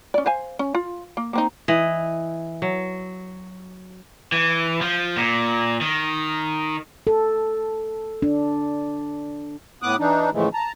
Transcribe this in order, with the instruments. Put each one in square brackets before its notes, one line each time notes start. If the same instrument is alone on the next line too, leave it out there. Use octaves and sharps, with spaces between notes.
[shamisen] C#4 D5
C5 F5 G#5
C#4
F4
A#3
A#3 C4 D#4
[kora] E3 D#5
F#3
[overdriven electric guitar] E3
F3
A#2
D#3
[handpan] A4
D4
[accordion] A2 B3 D6 D#6 F#6
E3 D4 D#4
A2 C#3 E3 F3 G#3 A3
A5 A#5